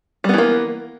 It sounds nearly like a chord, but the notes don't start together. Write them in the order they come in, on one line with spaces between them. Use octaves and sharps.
G3 B3 E3 A#3